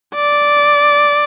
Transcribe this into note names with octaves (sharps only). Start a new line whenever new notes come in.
D5